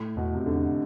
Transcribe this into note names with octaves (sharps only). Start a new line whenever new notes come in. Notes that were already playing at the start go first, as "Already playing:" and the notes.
Already playing: A2
E2 B2
C3
E2 D3